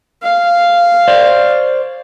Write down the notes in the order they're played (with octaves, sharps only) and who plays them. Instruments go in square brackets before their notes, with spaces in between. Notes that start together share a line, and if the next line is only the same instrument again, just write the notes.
[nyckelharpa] F5
[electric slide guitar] C5 D5